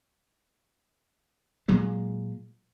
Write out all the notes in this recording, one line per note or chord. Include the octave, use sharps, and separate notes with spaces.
A#2 F#3 G#3